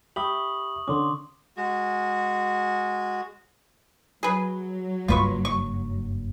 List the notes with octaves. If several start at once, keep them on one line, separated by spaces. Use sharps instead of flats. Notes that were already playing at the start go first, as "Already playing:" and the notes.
G4 E5 B5 C#6 D#6 F#7
D3 C#4 C6 D6
G#3 F#4
F#3 G#4 B4
F#1 G2 F4 B4 C#6
C#6